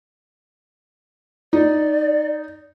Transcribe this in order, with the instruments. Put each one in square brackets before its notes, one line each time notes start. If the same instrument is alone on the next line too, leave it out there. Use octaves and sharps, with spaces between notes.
[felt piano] D#4 [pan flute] D5